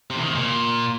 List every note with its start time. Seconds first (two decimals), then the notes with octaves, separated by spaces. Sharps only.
0.10 C3
0.16 E2
0.22 D#3
0.29 C3
0.35 A#2